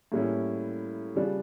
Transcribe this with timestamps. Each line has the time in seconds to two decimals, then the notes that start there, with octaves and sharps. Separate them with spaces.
0.12 A2 G3 A#3 C#4 E4
1.15 C#3 G3 D4 F4